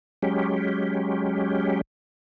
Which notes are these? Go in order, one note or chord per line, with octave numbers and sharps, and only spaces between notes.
F#3 G#3 C#4 G4